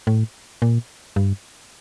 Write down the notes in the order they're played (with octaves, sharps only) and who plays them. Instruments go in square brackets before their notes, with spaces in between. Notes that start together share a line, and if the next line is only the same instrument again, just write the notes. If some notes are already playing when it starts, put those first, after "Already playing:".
[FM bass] A2
A#2
G2